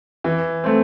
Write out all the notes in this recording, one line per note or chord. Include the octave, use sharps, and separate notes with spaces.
E3
A3 C4